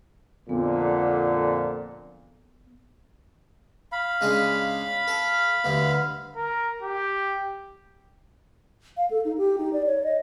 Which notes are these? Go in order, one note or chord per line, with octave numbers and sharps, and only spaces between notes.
F2 A#2 D3 B3
F5 B5
C#3 G#3 D4
A4
D2 G2 D3
A#4
G4
F5
A4
D#4
G4
D#4
D5
C#5
D#5